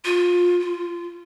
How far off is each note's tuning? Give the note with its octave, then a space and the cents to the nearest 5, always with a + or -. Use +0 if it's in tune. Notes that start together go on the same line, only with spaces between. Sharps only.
F4 +20
F4 -20